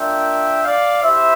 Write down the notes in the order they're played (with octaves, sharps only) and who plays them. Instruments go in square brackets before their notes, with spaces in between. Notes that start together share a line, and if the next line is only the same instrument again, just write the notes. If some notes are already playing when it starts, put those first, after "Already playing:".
Already playing: [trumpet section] A#3 D4 F4 E5 G5
D5 F5
E4 G4 C5 E5